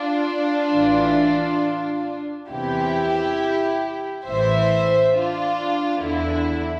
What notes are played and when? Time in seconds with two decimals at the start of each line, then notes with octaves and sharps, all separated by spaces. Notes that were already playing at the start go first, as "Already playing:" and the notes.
Already playing: D4 F4
0.73 A1 A2 E3
2.49 E2 C3 E3 E4 G4
4.25 A1 A2 E3 C5 E5
5.13 D4 F4
6.01 E2 D3 E4